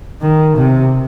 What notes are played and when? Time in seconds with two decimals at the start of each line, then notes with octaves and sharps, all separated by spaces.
0.21 D#3
0.57 C3